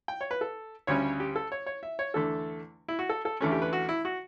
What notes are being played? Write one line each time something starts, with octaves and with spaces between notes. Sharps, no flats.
G5
C#5
B4
A4
D2 C#3 G3 C#4 C#5
G4
A4
C#5
C#5
E5
C#5
E2 D3 A3 A4
E4
F#4
A4
A4
E2 D3 A3 C#4
G4
B4
F#4
E4
F#4